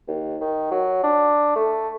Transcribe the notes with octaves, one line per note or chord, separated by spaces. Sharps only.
D#2
D#3
F#3
D4
A3